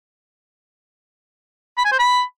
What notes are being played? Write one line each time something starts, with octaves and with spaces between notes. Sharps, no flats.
B5
G#5
C5
B5